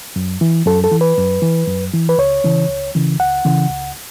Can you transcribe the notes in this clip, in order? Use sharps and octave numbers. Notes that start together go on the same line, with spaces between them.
F#2
E3
F#2 A4
A4
E3
B4
F#2
E3
F#2
E3
B4
C#2 C#5
C#3 E3
C#2
C#3 E3
C#2 F#5
C#3 E3
C#2